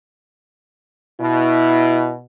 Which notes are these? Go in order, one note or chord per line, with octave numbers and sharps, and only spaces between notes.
B2 E4